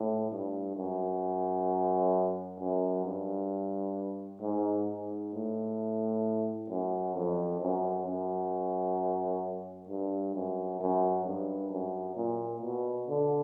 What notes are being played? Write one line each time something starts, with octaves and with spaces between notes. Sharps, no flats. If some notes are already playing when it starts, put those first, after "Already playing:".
Already playing: A2
G2
F#2
F#2
G2
G#2
G#2
A2
F#2
F2
F#2
F#2
G2
F#2
F#2
G2
F#2
A#2
B2
D3